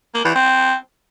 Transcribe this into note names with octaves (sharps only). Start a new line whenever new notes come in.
A#3
E3
C4